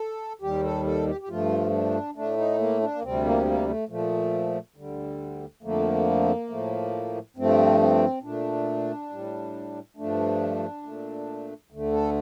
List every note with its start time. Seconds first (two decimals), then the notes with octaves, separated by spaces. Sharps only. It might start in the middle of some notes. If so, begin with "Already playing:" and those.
Already playing: A4
0.42 D#2 D#3 G3 G4
0.63 A4
0.85 A4
1.07 G4
1.21 G4
1.28 G2 F3 A3 F4
1.72 D4
2.15 A2 A3 D4
2.37 D#4
2.58 A#3
2.81 D4
2.95 A#3
3.02 D2 C3 G3 C4
3.24 A#3
3.46 A#3
3.67 A3
3.88 A#2 F3 A3
4.76 D2 D3 G3
5.63 F2 D3 F3 A3 A#3
6.49 A2 F3 A3
7.36 G2 F3 A3 C4
7.80 C4
8.22 A#2 A3 D4
9.10 A2 G3
9.97 G2 F3 A3 D4
10.83 A#2 A3
11.71 D2 D3 A3
11.93 A4